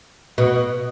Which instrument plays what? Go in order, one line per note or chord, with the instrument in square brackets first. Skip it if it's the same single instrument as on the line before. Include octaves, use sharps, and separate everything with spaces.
[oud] B2